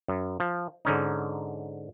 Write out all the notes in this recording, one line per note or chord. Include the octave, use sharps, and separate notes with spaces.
F#2
F3
G#2 D3 C#4 D#4